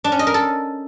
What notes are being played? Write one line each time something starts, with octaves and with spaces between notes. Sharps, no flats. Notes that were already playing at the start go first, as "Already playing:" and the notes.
D4
C#4
D#5
A#4
A4